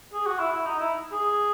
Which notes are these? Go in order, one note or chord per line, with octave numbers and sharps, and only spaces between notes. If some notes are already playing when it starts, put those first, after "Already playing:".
G#4
F#4
E4
E4
D#4
E4
G#4